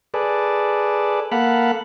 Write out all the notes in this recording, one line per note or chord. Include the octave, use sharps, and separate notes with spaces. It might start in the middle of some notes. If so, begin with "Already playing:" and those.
G#4 A4 B4 D5
A#3 A4 F5 F#5 B5